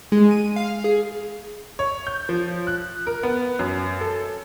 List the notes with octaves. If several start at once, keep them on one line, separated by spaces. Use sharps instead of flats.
G#3
D#7
F5
G#4
C#5
G6
F3
F#6
A#4
B3
F#2
A4